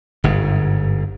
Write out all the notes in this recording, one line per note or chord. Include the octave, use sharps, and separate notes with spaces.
G1 G#2